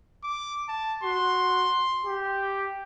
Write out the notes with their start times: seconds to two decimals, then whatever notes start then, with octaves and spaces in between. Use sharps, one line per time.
0.24 D6
0.69 A5
1.03 F#4 C6
2.06 G4